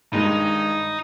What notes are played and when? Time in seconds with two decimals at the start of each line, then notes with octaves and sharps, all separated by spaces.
0.12 G2 D#3 G#3 D#4